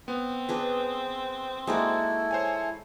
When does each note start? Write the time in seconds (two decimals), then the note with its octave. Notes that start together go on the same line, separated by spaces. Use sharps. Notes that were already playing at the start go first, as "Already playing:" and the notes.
0.08 B3 C4
0.49 D4 G#4 B4
1.67 G#3 A#3 D#4 E4 F#4 A4 D5
2.31 C5 C#5 G#5